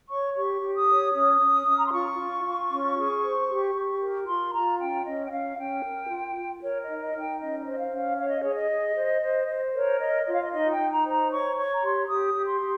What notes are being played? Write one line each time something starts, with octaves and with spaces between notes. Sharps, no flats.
C#5 C#6
G4 C#6
G4
D#6
C#5
C#4 D#6
C#4
C#4
A#5
C6
F4 C#6
F4
F4
C#4
G#4
C5
G4
G4
A#4
F4 C6
F4 A#5
C#4 G5
C#4 D#5
G5
C#4 F5
C#4 G5
A#4
F4
F4
A#4 C#5
D#5
D#4
D#5
D#4
G5
C#4 D#5
D#5
C5
D#5
F5
C#4
F5
C#5 F5
D#5
G#4 C#5
D#5
G#4
C5
C5
C5
A#4 C#5
C#5 D#5
F4 D#5
F5
D#5
D#4 D#5
G5
D#4
A#5
C5
A#5
C#5 C#6
C#5 C#6
A#5
G4 C6
G4 D#6
G4
C6
G4